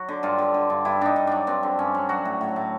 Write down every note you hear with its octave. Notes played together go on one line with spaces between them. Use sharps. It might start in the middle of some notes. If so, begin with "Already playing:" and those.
Already playing: F#3 F#4
D3
G2 F4
D3
D3
G2
G2 E4
G2 D4 D#4
G2
F#3 D4
G2 C4
D3
G2 C#4
F#3
F#3 F#4
A2
A2
A2